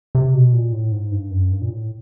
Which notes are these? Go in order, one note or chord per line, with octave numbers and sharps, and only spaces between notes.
C3
B2
A#2
A2
G#2
G2
F#2
G2
A#2
A2